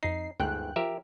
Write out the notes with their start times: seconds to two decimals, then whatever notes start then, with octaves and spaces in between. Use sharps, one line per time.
0.03 F2 D#4 C7
0.40 G1 D2 G#2 G5 F#6
0.76 F3 G4 A#4 E5